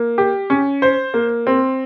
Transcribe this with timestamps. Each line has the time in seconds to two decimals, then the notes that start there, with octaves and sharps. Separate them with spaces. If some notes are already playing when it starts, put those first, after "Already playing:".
Already playing: A#3
0.18 G4
0.50 C#4
0.82 C5
1.14 A#3
1.47 C4